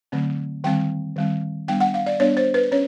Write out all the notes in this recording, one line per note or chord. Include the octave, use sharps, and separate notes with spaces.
D3 F#3 A3 C4
D#3 G3 C4 G5
D#3 G3 C4
G3 B3 D4 G5
F#5
F5
D5
G3 B3 D4 C#5
C5
B4
C#4 C#5